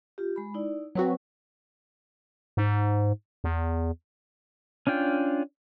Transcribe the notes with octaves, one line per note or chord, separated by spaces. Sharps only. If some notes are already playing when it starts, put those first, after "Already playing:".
F4 G4
G#3 B5
D#4 E4 D5
F#3 C4 F#4 B4
G#2
E2
C#4 D4 F4 G5